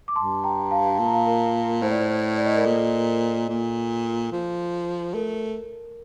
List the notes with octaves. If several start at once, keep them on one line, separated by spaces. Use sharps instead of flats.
D6
G2 A5 C6
G5 A#5
F5 A5
A#2 A5
A#5
F5 A5
A#4
A#4
A2 C5
D5
C5
C5
D5
D#5
A#4 D5
A#2 A4
A#2
F3
A3 A#4